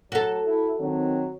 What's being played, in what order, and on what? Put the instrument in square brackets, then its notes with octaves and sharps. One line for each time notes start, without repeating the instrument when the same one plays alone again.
[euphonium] F#3 [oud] F#4 A4
[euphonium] E4
[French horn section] D#3 C4 [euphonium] F#3